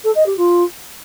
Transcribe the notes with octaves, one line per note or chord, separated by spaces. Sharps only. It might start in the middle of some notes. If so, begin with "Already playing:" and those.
A4
D#5
G4
F4